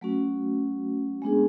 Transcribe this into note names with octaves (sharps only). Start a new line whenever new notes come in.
F#3 A3 C#4 F#4
G#3 B3 D4 G#4